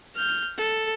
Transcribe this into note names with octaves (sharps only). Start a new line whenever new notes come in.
F6 G6
A4